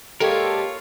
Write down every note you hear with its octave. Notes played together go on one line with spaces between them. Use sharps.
A#2 G#3 A#3 F4 G4 A4 A#4 C#5